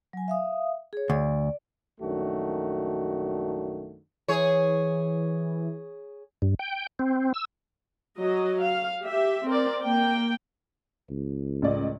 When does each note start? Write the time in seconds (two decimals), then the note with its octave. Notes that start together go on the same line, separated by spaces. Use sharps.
0.13 F#3 G#5
0.28 E5 F5 D#6
0.93 G#4 C#5
1.10 D2 D5
2.01 A#1 F#2 D#3 A3 D4 F#4
4.28 E3 G#4 C#5
6.42 G2
6.59 G5
6.99 C4
7.34 E6
8.16 F#3 D#5
8.61 F5
9.03 G4 E5
9.47 C4 A#4 D5
9.83 A#3 G5
11.10 C#2
11.62 A1 D5 D#5